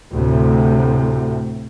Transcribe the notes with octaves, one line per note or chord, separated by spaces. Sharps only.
D2 A2 C3